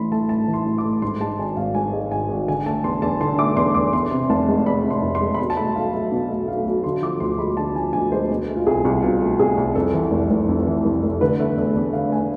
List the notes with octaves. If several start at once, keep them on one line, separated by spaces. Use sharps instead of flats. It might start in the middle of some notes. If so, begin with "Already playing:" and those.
Already playing: A1 A2 E3 B5 C6
A3 A5
A2 A5
E3
C6
A1
D6
A3
G#2 C6
G#3 A5
G#1 G#5
G#1 F5
G#2 G#5
G#3
G#1 G#5
G#1
D3 G#5
A3 A5
E2 C6
E2 A5
D3 C6
A3 D6
E2 C6
E2 D6
E2 C6
C3
F1 A5
G#3
E2 B5
C3
C6
F1
C6
G#3
B5
B2 C6
A5
A3 B5
B1 F5
B1 E5
B2
A3
B1 F5
B1
D3 C6
F3 D6
D2 C6
G#3 B5
D3 A5
F3 G#5
D2 G#5
G#3 C5
B2
A3
F4
C2 G#4
C2
B2 F4
A3
C2 G#4
C2
F2 A4
E3
F1
F1
F2
E3
F1
F1
D3 B4
A3
E2 A4
E2
D3 F5
A3 G#5